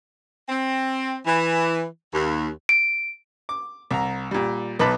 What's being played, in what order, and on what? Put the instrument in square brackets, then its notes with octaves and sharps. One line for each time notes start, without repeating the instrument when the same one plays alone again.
[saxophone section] C4
E3
D#2
[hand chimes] D7
[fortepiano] D6
C2 A#5
A#2 G3
B1 D#4 B4 A5 B5 D6